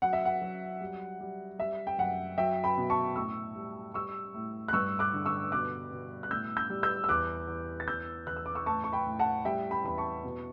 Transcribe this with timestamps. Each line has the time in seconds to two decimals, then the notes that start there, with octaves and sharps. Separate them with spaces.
0.02 F#3 F#5
0.13 E5
0.25 F#5
0.42 F#3
0.81 G3
1.20 G3
1.59 G3 E5
1.87 G5
1.98 F#2 F#5
2.38 F#3 E5 G5
2.64 G5 B5
2.78 B2
2.90 A5 C#6
3.16 A2 C#6 E6
3.55 G3
3.94 G3 C#6 E6
4.34 A2
4.68 F#6
4.73 G2 C#6 E6
4.99 D6 F#6
5.13 D3
5.26 C#6 E6
5.52 B2 D6 F#6
5.91 B2
6.23 F#6
6.31 A2 E6 G6
6.57 E6 G6
6.70 G3
6.83 E6 G6
7.04 E6
7.09 E2 D6 F#6
7.48 E2
7.80 A6
7.88 E2 E6 G6
8.27 E2 F#6
8.37 E6
8.46 D6
8.55 C#6 E6
8.66 A2 A5 C#6
8.84 C#6
8.93 G5 B5
9.06 A2
9.19 F#5 A5
9.45 G3 E5 G5
9.71 G5 B5
9.84 E2 B5
9.98 A5 C#6
10.24 B2